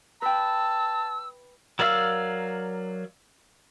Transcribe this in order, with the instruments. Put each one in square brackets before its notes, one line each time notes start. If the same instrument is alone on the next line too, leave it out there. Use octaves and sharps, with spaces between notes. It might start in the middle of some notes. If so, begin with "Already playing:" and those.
[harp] B4 G5 [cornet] A5 [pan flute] E6
[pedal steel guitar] F#3 A#4 D5 F5 E6